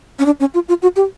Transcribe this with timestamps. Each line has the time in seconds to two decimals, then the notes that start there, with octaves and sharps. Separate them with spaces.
0.19 C#4
0.26 D4
0.40 C#4
0.54 F4
0.69 F4
0.82 F#4
0.96 G4